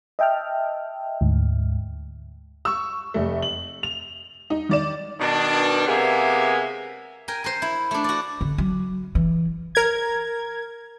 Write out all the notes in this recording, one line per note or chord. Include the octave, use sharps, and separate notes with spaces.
D#5 E5 G5 A5 F6
D2 G#2
C#6 E6
F1 A3
F#7
F7
D#4
D#3 D5 E7
B2 D#3 D4
C3 G#3 A#3 B3 E5 G#5
A#4 G5 G#5
A#4 C5
E4
A3 D4
F#4 D5
D3
F#3
E3
A#4 G#6